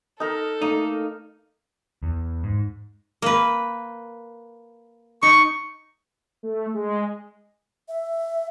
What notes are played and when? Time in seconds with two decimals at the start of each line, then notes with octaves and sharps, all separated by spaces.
0.20 D#4 A4 A#4
0.62 A3 A#3 D#4
2.03 E2
2.43 G#2
3.22 A#3 B4
5.23 D#4 C#6
6.43 A3
6.74 G#3
7.89 E5